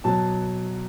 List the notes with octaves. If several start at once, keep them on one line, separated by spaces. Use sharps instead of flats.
B2 F#3 A5